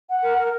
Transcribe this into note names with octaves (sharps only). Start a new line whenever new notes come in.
F#5
A#4
A#4